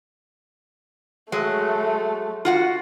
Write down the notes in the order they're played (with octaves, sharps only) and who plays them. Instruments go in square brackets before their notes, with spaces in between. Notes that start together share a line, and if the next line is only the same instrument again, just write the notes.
[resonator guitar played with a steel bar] F#3 G#3 [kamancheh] A3
[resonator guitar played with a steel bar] F4 F#4 F#5